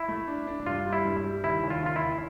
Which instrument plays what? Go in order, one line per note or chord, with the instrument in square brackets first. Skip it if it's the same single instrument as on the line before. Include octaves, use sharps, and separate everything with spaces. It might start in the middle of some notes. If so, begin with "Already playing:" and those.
Already playing: [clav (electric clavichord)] E4
[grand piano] A3
D4
D4
[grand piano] G2 [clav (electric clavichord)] F4
[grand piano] G3
[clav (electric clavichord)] E4
[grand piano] G2
G3
[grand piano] D#2 [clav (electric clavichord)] E4
[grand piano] D#2
[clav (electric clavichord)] F4
[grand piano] D#3 [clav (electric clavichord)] F4
[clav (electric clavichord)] E4
[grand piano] D#2